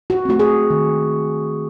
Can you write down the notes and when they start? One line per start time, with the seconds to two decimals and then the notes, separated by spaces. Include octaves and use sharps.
0.10 F#4
0.25 A3 C4 F#4
0.40 G#4
0.70 D#3